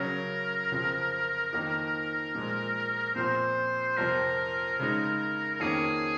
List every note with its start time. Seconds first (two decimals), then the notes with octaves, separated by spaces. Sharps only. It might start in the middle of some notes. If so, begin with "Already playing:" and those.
Already playing: C#3 F#3 C#4 A#4
0.72 F2 C#3 F3
1.53 F2 D#3 A#3 D#4
2.35 A#2 F3 G#3
3.16 A#2 F3 C4 C5
3.97 F2 C3 F3 C4 A#4
4.79 C#3 G#3 D#4
5.55 A#4
5.60 F2 D#3 A#3 C#4 G#4